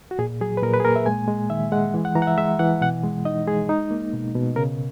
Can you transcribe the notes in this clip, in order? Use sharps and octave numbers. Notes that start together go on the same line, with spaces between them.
F#4
A#2 G#4
F#3 G#4
B4
A#2 A#4
B4
G#4
A#3 A#4
E5
G#3 G#5
G#3
D#3 E5
G#3 F#5
E3
F#5
E3 A#5
F#5
E5
G#3 E5
E3 F#5
B2 F#5
G#3
D#4 D#5
G#3 G#4
D#4
A#3
B2
B2
C#3 A#4